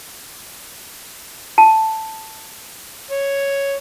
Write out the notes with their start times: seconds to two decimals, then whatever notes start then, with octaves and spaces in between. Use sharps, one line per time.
1.58 A5
3.11 C#5